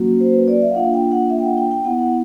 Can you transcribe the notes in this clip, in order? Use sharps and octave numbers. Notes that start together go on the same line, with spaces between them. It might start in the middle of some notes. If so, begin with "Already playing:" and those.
Already playing: F#3 A#3 C#4 F#4
C5
B4
D5
E5
F5
A#3 D4 F4 F#5
G5
F#5
E5
G5
F#5
G5
G5
B3 E4 F#5
F#5